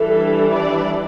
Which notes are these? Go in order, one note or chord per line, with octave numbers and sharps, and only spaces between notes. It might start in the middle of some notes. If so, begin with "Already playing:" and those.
Already playing: E3 G3 D4 A4
D5